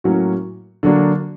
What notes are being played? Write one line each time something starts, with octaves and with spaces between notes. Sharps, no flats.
A2 F#3 A#3 C#4 F#4
D3 F#3 A#3 D4 F#4